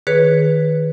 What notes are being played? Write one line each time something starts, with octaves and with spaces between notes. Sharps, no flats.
D#3 G#4 B4 C#5